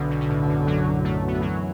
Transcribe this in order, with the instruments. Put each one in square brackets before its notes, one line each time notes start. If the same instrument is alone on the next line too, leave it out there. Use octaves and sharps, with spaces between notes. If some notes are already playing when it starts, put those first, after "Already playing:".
Already playing: [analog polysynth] B1 B2 [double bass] D3
[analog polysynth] B1 B2
B2
A2
F#2
F#2 F#3
A2 A3
B3
A3
[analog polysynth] F#2 F#3 [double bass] E3